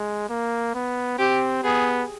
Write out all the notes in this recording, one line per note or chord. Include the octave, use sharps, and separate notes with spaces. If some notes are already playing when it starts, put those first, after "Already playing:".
Already playing: G#3
A#3
B3
C4 G4
B3 G#4